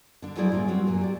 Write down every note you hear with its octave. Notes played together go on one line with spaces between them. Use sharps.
D3 D4
F3 F#3 E4 G#4 C5 D5
A2 C#3 G3 A#3
F#3 G3 C4 E4 F#4
F#2 A#2 F#3
G4 D5